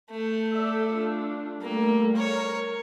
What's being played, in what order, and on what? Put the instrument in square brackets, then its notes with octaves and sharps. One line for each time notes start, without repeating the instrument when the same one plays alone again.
[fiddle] A3
[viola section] A4 D5 E5
D4 F4
[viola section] G3 A3 [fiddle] A#3
[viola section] A#4 [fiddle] C#5